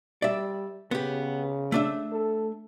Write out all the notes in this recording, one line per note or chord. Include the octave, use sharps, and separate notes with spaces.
G3 D5 E5
C#3 B3 G4
A3 D4 E5
A4